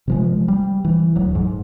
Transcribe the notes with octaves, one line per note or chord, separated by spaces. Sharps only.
C3 F3 G#3
G3
E3
D1 F#3
G#2